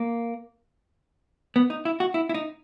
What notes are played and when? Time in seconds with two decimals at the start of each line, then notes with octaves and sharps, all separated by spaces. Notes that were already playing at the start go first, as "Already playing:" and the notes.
Already playing: A#3
1.56 B3
1.70 D#4
1.85 E4
2.00 F#4
2.14 E4
2.29 E4
2.34 D#4